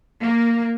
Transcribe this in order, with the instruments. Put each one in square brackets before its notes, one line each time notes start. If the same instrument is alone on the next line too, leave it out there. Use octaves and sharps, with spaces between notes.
[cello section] A#3